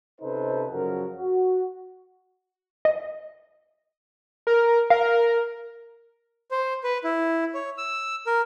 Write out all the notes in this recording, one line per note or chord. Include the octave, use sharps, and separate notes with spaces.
C3 C#4 D#4 A4 B4 C5
F#2 C#3 F3 F#4 A#4
F#4
D#5
A#4
A#4 F5
C5
B4
E4
C#5
E6
A#4